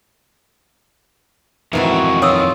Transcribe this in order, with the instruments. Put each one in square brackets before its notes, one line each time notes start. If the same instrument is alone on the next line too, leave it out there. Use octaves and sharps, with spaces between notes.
[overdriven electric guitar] F2 D#3 [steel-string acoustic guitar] G#2 E3 F#4 [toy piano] E5
[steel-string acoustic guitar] F4 [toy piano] C#5 D#6 E6